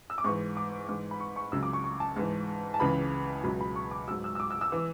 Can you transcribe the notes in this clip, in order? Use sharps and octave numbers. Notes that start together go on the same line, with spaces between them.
E6
D6
G#2 E3 C#6
D6
G#2 E3
B5
C#6
C#6
C#2 C#3 F#3 E6
D6
C#6
C#6
A5
G#2 E3
A5
C#2 C#3 E3 B5
C#2 B2 F#3 B5
B5
C#6
D6
G#2 F#3 E6
E6
E6
D6
E6
E6
E3